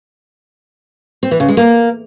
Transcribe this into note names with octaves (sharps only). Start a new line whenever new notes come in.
C4
E3
C#3
G#3
A#3